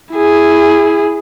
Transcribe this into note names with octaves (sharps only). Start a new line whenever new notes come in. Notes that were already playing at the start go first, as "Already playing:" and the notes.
E4 G#4